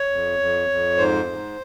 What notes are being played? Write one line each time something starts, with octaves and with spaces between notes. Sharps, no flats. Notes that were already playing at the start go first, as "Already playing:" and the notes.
Already playing: C#5
F2
F2
F2
G#2 C5
G#2